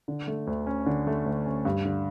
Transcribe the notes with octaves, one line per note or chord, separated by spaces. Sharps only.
D3
A3
D2
C#4
D3
A3
D2
C#4
G2
D3